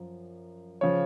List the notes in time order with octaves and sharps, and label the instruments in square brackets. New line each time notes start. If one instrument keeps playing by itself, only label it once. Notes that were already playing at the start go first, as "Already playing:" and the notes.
Already playing: [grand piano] F#2 F3
C#3 F3 C#5